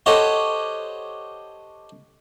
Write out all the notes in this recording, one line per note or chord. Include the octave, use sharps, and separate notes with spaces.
G4 A4 C5 C#5 D#5 F#5